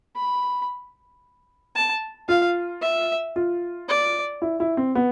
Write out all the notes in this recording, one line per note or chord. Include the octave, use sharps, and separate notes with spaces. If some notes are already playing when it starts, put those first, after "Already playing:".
B5
A5
F4 F5
E5
F4
D5
E4
E4
C4
B3